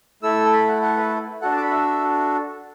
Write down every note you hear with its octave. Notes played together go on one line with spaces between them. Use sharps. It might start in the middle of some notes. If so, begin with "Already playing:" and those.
A3 E4 A4 E6
A5
B5
F#5
F#5
B4
D4 F#4 A4 F#5
A5
D6
B5
E5